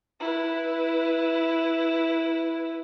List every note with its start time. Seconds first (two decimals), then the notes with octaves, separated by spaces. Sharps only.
0.20 E4 B4